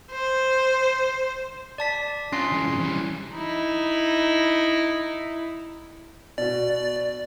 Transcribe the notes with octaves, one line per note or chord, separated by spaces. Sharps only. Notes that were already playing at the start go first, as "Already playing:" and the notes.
C5
D5 A5 B6
C#4 D4 F4 C6 C7
E3 G#3
F#2 C3
E3 G3
D#4 E4
B2 F#4 D5